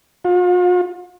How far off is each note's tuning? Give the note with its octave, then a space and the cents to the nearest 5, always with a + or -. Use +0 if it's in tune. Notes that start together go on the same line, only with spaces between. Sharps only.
F4 +45